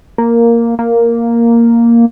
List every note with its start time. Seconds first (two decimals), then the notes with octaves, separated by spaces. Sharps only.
0.18 A#3
0.79 A#3